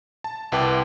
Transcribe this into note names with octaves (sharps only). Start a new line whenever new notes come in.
A5
C2 E4 B4 G5 A5 D6